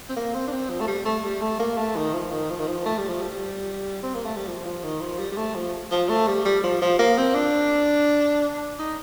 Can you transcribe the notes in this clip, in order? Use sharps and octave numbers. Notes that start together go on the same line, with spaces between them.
C4
A#3
C4
D4
C4
F3
A3
G3
A3
G3
A3
A#3
A3
D#3
F3
D#3
F3
D#3
F3
A3
G3
F3
G3
C4
A#3
A3
G3
F3
F3
D#3
F3
G3
G3
A3
F3
F3
A3
G3
G3
F3
F3
A#3
C4
D4
D#4